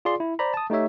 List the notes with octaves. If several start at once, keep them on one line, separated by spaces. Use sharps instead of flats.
F4 G#4 D5 C6
E4
C5 D5 A#5 B5
A5 D#6
A3 D#4 G4 C#5 E5